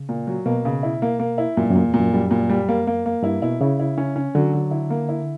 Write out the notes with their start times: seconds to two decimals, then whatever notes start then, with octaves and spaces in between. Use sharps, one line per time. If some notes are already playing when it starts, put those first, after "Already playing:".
Already playing: C#3
0.09 A#2
0.27 F#3
0.46 B2 A#3
0.65 C#3
0.83 E4
1.02 A#3
1.19 A#3
1.38 E4
1.57 F#2 A#2
1.63 G2
1.71 F#2 A#2
1.85 E2
1.94 A#2
1.99 F#2
2.13 F#2 G3
2.31 A#2
2.50 G3
2.69 A#3
2.87 A#3
3.06 A#3
3.23 G2 E4
3.42 B2 E4
3.61 C#3 E4
3.79 E4
3.98 C#4
4.16 C#4
4.35 D3 F#3
4.53 F#3
4.71 E4
4.90 A#3
5.09 E4